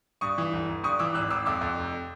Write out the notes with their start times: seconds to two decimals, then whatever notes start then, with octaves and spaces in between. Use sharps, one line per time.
0.21 G2 C#6 D#6
0.38 E3
0.53 G1
0.68 G1
0.84 G2 C#6 D#6
0.99 E3 D6 E6
1.15 G#1 E6 F#6
1.30 G#1 D6 E6
1.46 F2 D6 E6
1.61 F2
1.77 F1